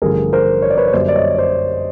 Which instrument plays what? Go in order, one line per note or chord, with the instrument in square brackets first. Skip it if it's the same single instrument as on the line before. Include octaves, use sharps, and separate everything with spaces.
[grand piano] A1 G2 D3 F3 G#4 A#4
A#4 C5
C#5
D5
B4 C#5
C#5
F#2 D3 G3 A#3 C5 D5
D5
C#5 D#5
C5 D5